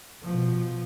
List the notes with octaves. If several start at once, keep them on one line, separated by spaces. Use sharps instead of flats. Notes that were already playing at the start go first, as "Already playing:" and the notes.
B2 F3